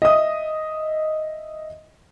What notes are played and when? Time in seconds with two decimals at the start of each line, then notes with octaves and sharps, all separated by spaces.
0.02 D#5 E5 D#6